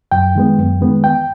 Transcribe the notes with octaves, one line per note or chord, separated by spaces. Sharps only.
F#2 G5
D#3 G#3 B3
F#2
D#3 G#3 B3
E2 G5